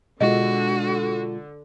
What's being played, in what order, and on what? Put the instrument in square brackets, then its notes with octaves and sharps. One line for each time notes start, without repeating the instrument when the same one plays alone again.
[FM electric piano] B2 G#3 F4 [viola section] D3 [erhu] F#4 [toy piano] D#5